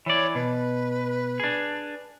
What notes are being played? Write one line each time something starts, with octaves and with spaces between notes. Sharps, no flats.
E3 C#5 D5
B2 B4
D4 G#4